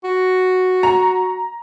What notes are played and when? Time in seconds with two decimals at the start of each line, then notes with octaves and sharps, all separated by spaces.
0.04 F#4
0.83 A#5